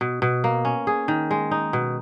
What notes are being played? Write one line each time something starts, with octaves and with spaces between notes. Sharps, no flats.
B2
B2
A#3
C#4
G#4
D#3
G#3
D#4
B2